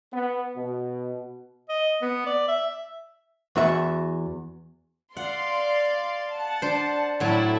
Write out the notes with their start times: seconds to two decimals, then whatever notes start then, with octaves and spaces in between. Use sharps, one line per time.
0.13 B3
0.57 B2
1.69 D#5
2.02 B3
2.26 D5
2.48 E5
3.56 E2 F#4 E5
5.17 D5 F5 F#5 C6
6.32 F#5 A5
6.62 D4 C5
7.20 A2 F#3 D4 E4 A4